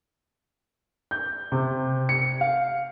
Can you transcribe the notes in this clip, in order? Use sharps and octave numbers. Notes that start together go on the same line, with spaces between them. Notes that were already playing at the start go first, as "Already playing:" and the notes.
G6
C3
C#7
F5